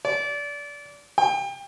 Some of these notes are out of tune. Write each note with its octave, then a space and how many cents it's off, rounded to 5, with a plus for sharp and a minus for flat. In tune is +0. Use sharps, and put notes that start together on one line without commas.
D5 -25
G5 +30